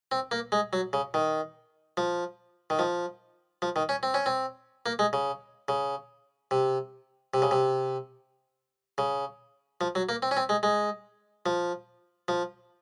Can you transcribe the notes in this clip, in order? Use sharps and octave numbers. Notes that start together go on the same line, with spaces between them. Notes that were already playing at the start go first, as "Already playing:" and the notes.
C4
A#3
G#3
F#3
C#3
D#3
F3
D#3
F3
F3
D#3
C#4
C4
C#4
C4
A#3
G#3
C#3
C#3
C3
C3
C#3
C3
C#3
F3
F#3
A#3
C4
C#4
C4
G#3
G#3
F3
F3